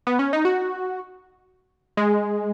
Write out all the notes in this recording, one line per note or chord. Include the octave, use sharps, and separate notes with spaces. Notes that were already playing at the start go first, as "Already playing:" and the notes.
B3
C#4
D#4
F#4
G#3